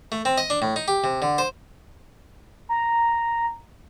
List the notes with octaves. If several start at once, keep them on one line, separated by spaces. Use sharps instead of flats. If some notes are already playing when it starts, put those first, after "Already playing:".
A3
C4
D#5
D4
A2
D#4
G4
C3
D3
C5
A#5